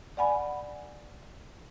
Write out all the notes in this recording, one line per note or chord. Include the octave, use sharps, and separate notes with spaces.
D5 F#5 G#5 B5